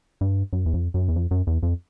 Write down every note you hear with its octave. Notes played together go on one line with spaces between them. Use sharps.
G2
F#2
E2
F2
F#2
E2
F2
F#2
E2
F2